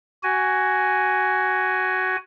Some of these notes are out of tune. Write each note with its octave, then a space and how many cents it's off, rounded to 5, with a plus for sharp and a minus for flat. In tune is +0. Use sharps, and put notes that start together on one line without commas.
F#4 +15 G#5 +0